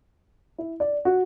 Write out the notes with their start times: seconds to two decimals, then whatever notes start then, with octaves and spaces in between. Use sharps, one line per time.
0.58 E4
0.80 D5
1.05 F#4